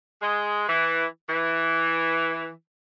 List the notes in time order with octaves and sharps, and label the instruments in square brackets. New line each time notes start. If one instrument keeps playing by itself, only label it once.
[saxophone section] G#3
E3
E3